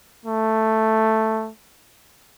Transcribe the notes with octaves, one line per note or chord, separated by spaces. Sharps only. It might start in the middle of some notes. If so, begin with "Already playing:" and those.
A3